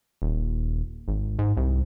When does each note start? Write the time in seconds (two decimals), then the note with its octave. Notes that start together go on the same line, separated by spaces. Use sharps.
0.22 D#1
1.08 G#1
1.39 G#2
1.57 C2